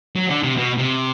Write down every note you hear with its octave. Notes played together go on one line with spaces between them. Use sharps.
F#3
D3
C3
B2
C3